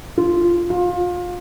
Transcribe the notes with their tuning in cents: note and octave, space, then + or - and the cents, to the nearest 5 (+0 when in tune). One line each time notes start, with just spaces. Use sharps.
F4 -10
F4 +25